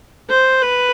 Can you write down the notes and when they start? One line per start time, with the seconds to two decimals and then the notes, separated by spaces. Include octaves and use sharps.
0.30 C5
0.62 B4